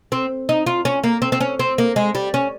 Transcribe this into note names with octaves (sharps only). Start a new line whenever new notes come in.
C4
D#4
F4
C#4
A#3
C4
C4
C#4
C4
A#3
G#3
G3
C#4